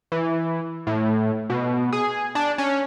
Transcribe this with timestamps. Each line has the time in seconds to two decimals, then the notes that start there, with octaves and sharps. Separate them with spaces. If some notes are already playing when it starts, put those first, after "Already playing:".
0.12 E3
0.87 A2
1.50 B2
1.92 G#4
2.35 D4
2.58 C#4